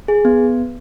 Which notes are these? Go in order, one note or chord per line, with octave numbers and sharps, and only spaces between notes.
G#4
B3